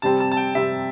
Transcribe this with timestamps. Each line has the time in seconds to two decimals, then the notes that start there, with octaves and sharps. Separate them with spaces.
0.02 C3 G3 C4 A5
0.20 A5
0.31 A5
0.37 G5
0.55 C3 G3 C4 E5